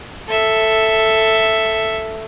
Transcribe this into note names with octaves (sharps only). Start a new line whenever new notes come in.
A4 E5